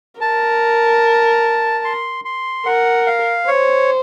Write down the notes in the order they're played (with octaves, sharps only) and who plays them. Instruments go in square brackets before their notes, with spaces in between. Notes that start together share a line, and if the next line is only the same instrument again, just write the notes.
[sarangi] A#4 [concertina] A5
[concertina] C6
C6
[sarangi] A#4 [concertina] F#5
[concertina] F5
[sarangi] C5 [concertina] C#5